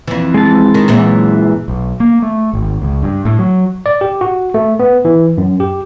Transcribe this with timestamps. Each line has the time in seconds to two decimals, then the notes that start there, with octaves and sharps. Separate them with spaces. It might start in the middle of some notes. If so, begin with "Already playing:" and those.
0.07 F2 E3
0.34 G#3 A5
0.74 D#3
0.88 F#2 A#2 E3
1.68 B1
2.00 A#3
2.22 A3
2.53 G#1
2.82 C#2
3.02 G2
3.25 A2
3.39 F#3
3.86 D5
4.01 G4
4.21 F#4
4.54 A3
4.80 B3
5.05 E3
5.38 F#2
5.60 G4